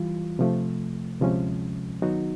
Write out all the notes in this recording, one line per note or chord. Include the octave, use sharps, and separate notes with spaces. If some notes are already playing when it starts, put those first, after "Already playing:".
Already playing: E3 G3 F4
C3 F3 A3
D2 C3 F3 G#3 C#4
D#3 F#3 B3 D#4 F#4